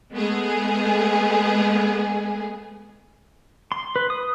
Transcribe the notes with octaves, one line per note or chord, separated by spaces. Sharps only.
G#3 A3 B3 G#4
C6
B4
D#6